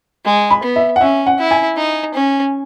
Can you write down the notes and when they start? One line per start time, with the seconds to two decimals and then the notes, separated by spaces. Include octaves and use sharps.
0.25 G#3
0.50 B5
0.63 B3
0.76 E5
0.96 F#5
1.01 C#4 E5
1.26 F#5
1.39 E4
1.51 G#5
1.77 D#4
2.14 C#4